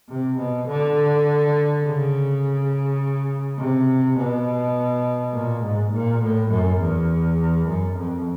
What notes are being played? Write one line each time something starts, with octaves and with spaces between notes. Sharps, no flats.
C3
B2
D3
C#3
C3
B2
A#2
G#2
A#2
A2
F#2
E2
F#2
F2